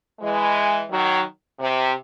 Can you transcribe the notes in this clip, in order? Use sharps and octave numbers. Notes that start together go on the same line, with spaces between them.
E3 G#3
D#3 F#3
C3